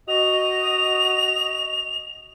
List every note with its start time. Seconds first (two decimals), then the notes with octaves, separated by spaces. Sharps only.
0.08 F#4 D#5 F7